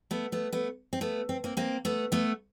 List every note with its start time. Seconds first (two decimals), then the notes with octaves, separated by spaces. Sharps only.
0.11 A3 B3
0.32 A3 B3
0.52 A3 B3
0.93 C4
1.01 A3 B3
1.29 C4
1.44 A#3 C4
1.57 A#3 C4
1.85 A3 B3
2.12 A3 B3